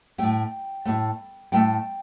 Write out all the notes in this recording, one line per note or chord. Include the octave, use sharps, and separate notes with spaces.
A2 A3 G5
A2 A3
A2 A3 G5